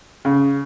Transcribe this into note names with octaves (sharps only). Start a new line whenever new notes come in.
C#3